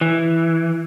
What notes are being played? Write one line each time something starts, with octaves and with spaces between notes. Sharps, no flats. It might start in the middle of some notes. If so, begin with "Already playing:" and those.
E3